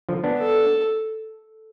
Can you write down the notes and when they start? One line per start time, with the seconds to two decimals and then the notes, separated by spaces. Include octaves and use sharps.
0.09 D3 F3
0.24 B3 D4
0.39 A4